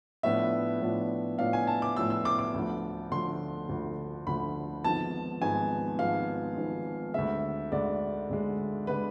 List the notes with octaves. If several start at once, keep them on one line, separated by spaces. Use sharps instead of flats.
A2 F3 B3 D4 F4 E5
A2 F3 B3 D4 F4
A2 F3 B3 D4 F4 F5
G#5
A5
D6
A2 F3 B3 D4 F4 E6
E6
D6
D6
D2 D3 F3
D2 D3 F3 C6
D2 D3 F3
D2 D3 F3 B5
G#1 G#2 F3 B3 A5
G#1 G#2 F3 B3 G#5
G#1 G#2 F3 B3 F5
G#1 G#2 F3 B3
D2 D3 G#3 E5
D2 D3 G#3 D5
D2 D3 G#3
D3 G#3 B4